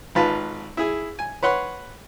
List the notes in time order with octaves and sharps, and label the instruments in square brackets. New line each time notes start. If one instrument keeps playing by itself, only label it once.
[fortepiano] G#1 F4 B4 A5
E4 G#4
G#5
B4 C#5 F#5 C6